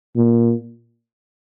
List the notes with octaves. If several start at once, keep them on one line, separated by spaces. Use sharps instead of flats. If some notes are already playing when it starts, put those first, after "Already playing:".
A#2